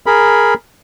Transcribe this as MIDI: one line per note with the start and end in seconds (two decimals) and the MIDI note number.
0.06 0.54 68
0.06 0.54 70
0.06 0.54 83